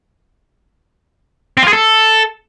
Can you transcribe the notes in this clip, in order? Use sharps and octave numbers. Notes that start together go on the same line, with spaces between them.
C4
F4
G#4
A4